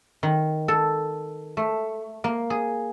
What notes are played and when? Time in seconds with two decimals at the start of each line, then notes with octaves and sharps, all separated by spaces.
0.23 D#3
0.68 A4
1.57 A3
2.24 A#3
2.50 G#4